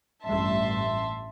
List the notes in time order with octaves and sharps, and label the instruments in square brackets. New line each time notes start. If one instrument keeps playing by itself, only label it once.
[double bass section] A1 G2 A3 [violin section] E5 A5 C6